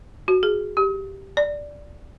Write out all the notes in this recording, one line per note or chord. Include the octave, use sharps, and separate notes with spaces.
F#4
G#4
G4
D5